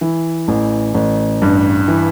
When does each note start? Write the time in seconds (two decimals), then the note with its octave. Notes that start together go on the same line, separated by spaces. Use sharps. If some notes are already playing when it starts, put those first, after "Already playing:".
0.01 E3
0.48 A1
0.94 A1
1.42 G2
1.88 E3